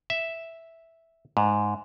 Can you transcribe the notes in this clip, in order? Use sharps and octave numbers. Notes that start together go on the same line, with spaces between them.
E5
G#2